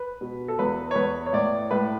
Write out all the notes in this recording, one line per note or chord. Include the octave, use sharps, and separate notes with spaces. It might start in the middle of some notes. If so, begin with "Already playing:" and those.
Already playing: B4
B2
A4
E2 B4
C#5
E2 B4
C#5
A2 D5
A2 B4